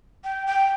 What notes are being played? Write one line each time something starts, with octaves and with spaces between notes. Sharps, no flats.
G5
G5